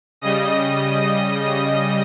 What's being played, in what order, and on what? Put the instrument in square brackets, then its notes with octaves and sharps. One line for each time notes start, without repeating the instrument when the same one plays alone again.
[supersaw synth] C#3 G3 D#5 D#6